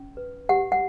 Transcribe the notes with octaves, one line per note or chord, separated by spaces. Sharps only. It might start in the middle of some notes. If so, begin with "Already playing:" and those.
Already playing: C#4
B4
G4 F#5
F#5